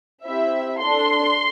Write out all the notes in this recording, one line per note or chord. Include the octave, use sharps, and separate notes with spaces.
C4 E4 G4 E5
D4 A4 C6